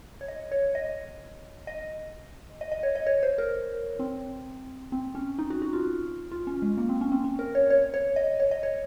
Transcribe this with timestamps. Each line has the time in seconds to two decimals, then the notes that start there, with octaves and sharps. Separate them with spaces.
0.21 C#5
0.28 D#5
0.52 C#5
0.75 D#5
1.67 D#5
2.61 D#5
2.72 D#5
2.83 C#5
2.95 D#5
3.07 C#5
3.23 C5
3.38 A#4
3.99 C4
4.92 C4
5.15 C#4
5.39 D#4
5.50 F#4
5.62 F#4
5.73 F4
6.32 F4
6.47 C#4
6.62 G#3
6.78 A#3
6.89 C4
7.01 C#4
7.12 C4
7.24 C#4
7.39 A#4
7.55 C#5
7.70 C#5
7.94 C#5
8.16 D#5
8.40 C#5
8.51 D#5
8.63 C#5